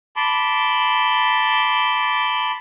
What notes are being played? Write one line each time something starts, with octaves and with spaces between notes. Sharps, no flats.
A5 B5 C6 D6